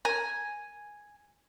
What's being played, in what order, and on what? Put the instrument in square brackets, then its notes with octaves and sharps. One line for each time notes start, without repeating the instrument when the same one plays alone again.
[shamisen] A#4 [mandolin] G#5